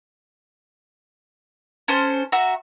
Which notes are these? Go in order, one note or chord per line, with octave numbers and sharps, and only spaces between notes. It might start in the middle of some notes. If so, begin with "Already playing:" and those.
C#4 A4 C5
F#4 E5 A#5